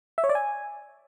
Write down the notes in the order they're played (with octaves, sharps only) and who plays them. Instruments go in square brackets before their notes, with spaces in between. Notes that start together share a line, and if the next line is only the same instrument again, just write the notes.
[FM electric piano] E5
C#5
D5
G#5